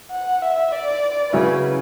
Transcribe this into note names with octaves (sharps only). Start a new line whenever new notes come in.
F#5
E5
D5
C#3 F#3 C#4 E4 B4